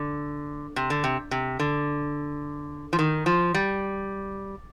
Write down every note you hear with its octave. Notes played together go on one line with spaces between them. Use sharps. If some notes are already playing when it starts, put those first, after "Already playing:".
Already playing: D3
C3
D3
C3
C3
D3
F3
D#3
F3
G3